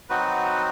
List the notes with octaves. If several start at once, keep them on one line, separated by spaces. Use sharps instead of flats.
F#3 C4 D#4 F#4 B4